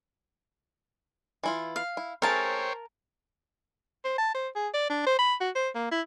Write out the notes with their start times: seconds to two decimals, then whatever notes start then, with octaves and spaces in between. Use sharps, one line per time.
1.44 E3 E4 F4
1.76 F5
1.97 E4
2.22 A3 C#4 G#4 A#4 C5 C#5 G5 A5
4.04 C5
4.18 A5
4.34 C5
4.55 G#4
4.74 D5
4.89 D4
5.06 C5
5.19 B5
5.40 F#4
5.55 C5
5.75 A#3
5.91 E4